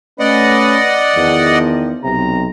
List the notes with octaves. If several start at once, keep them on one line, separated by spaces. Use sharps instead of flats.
A3 C#4 B4 D5 D#5 F#5
E2 D#3 F3
B1 C3 A#5